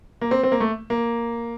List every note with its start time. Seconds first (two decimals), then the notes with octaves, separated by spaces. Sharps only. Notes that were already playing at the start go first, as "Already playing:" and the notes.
0.21 A#3
0.31 C4
0.43 C4
0.52 A#3
0.60 A3
0.90 A#3